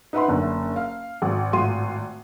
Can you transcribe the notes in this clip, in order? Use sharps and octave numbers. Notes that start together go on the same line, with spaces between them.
D#4 B4 E5 F#5 B5 C6
F#1 D3
F5
G#1
G#1 A2 F4 F#4 C6 D#7